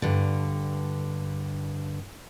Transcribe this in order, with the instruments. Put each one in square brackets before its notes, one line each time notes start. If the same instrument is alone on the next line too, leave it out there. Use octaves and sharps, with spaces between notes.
[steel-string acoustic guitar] G2 D3